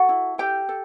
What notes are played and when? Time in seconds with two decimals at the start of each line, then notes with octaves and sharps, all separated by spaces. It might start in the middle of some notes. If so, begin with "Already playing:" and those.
Already playing: F#4 A4 F#5
0.09 E4
0.38 G4 A4 G5
0.69 A4